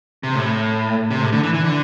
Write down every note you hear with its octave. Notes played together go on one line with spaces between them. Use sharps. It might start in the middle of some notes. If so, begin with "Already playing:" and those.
C3
A2
C3
A2
D3
E3
E3
D3